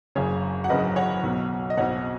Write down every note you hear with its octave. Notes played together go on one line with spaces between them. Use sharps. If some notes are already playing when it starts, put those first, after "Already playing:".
F#1 F#2 C#3 G#4 C#5
F#5
F#1 F#2 C#3 B4 D#5
C#5 F#5
B1 B2
D#5
B1 B2 C#5 F#5